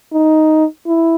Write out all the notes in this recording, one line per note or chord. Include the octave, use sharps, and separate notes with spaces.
D#4
E4